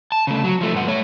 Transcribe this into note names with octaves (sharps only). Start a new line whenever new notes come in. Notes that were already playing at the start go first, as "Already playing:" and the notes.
A5
C#3 A3
F#3
F3 A3
G2 F#5
A3 C#5